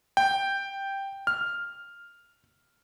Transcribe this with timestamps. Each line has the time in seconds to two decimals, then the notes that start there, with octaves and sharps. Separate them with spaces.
0.17 G5
1.27 F6